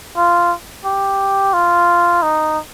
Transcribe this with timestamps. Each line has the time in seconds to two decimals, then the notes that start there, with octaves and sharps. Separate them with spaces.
0.17 F4
0.85 G4
1.54 F4
2.22 D#4